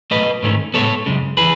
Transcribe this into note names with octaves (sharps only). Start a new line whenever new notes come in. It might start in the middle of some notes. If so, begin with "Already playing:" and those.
B1 B2 A3 B4 D#5
G#2 D#3 A3 C#4
A2 G#3 B3 A4 C#5
F#2 C#3 G#3
E3 G#4 B4